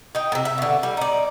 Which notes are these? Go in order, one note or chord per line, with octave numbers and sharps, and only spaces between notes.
D#4 G5
A2 C3
E5
B2 D3
G3
D#4 D5